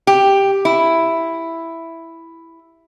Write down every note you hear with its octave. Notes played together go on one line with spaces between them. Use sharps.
G4
E4